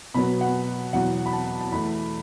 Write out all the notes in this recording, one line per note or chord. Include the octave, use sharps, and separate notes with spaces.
B2 F#3 B3 B5
F#5
E2 B2 F#3 F#5
B5
A5
A5
E2 E3 A3 B5